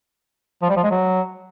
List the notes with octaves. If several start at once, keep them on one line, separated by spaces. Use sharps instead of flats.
F3
G3
F3
G#3
F#3